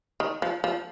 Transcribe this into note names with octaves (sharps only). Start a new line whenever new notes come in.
D#3
F3
F3